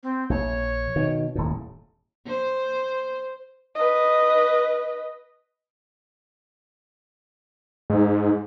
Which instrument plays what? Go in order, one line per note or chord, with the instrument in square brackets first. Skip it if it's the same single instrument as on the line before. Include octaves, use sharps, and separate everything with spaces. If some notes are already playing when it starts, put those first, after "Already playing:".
[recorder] C4
[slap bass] A#1 [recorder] C#5
[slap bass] B2 D#3
D#1 A2
[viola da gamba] C5
[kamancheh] B4 D#5
[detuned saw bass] G#2